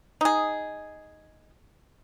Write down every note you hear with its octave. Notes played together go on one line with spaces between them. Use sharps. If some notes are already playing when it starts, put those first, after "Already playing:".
D#4 G#4